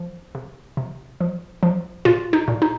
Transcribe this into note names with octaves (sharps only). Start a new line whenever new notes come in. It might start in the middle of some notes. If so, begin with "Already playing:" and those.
Already playing: F3
C3
C3
F3
F3
A#2 F4
D#4
A#2
D#4